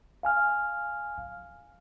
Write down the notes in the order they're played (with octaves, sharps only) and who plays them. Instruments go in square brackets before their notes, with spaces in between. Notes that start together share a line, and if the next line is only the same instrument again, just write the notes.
[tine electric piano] F5 G#5 F6